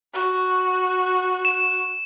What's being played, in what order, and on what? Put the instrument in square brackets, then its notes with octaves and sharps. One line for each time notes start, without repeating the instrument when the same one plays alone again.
[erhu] F#4
[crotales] E7